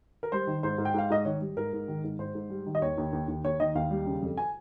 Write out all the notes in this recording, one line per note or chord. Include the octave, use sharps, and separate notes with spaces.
A#4
G3 C5
D#3
G#2 C5
G#2
G5
G#2 F5
G#2 D#5
D#3 C#5
G3
G#2 A#4
G#2
D#3
G#2
G#2 C5
G#2
G3
D#3
D#5
D#2 C#5
D#2
D#2
D#2
D#2 C#5
D#3 D#5
D#2 F5
G3
C#3
F2
G#5